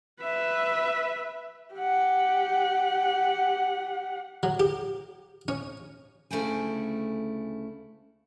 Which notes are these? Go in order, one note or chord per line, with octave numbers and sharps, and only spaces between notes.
B4 E5
G4 F#5
F#3
G4
C#4
D2 C#3 A3 E4 G5 G#5